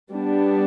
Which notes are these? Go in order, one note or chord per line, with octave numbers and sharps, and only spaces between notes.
G3 B3 D4